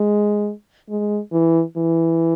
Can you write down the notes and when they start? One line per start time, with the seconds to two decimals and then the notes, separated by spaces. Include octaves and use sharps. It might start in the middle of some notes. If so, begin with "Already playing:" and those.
Already playing: G#3
0.89 G#3
1.33 E3
1.77 E3